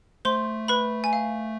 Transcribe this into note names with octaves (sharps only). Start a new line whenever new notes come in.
A3 C5 C6
B4 B5
G#5
F5